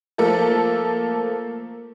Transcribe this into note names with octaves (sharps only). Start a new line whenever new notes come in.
F3 A3 A#3 A4